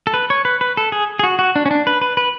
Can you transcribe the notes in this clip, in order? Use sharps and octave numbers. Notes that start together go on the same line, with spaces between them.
A4
B4
C#5
B4
B4
A4
G#4
G#4
F#4
F#4
D4
C#4
D4
B4
B4
B4